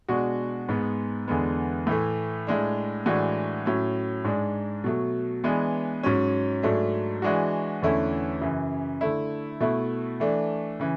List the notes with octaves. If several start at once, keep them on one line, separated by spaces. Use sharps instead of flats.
B2 G#3 D4 F#4
G#2 G#3 B3
E2 D3 G#3 B3
A2 E3 A3
A2 G#3 D4
A2 E3 G#3 D4 F#4
A2 F#3 C#4
G#2 G#3 D4
B2 F#3 A3
E3 G#3 B3 D4
G#2 F#3 C#4
G#2 F#3 A3 D4
E3 G#3 D4 F#4
E2 D3 A3 C#4 E4
F#2 C#3 E3
D3 A3 E4
B2 A3 E4
E3 A3 D4
C#3 E3